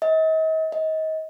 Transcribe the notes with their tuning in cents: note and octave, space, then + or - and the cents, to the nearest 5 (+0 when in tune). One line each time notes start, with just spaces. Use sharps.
D#5 +40
D#5 +30